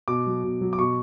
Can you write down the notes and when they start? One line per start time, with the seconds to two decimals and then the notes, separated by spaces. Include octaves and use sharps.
0.08 B2 D6
0.27 F#3
0.44 B2
0.61 F#3
0.73 D6
0.79 B2 C#6